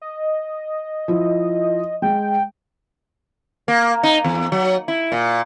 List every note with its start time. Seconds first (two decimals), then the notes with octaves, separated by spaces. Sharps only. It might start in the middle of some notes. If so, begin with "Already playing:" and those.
0.01 D#5
1.08 F3 E4
2.02 G#3 G5
3.68 A#3
4.03 D#4
4.24 E2
4.52 F#3
4.88 E4
5.12 A#2